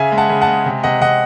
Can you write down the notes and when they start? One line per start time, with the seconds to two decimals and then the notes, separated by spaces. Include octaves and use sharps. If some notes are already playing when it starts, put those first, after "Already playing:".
Already playing: C#3 E5 G#5
0.12 G#3
0.17 F#5 A5
0.29 C#3
0.41 F#5 A5
0.48 G#3
0.66 C3
0.84 C3 D#5 F#5
1.01 C3 D#5 F#5